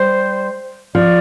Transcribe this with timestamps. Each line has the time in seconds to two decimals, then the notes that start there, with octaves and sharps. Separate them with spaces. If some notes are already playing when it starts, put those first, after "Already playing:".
Already playing: G3 C5
0.95 F3 D5